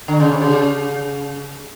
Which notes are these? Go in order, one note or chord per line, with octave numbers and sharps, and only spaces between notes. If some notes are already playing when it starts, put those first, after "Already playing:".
D3
C#3
C3
C#3